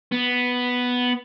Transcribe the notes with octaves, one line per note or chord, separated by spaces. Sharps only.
B3